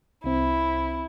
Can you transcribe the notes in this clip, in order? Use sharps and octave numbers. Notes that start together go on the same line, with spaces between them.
C2 C4 E4